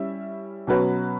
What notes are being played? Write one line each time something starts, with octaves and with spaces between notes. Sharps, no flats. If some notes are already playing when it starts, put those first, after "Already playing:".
Already playing: G3 C#4 E4 E5
B2 F#3 C#4 F#4 B4